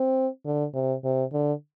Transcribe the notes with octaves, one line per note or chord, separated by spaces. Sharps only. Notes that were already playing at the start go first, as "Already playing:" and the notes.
Already playing: C4
D3
C3
C3
D3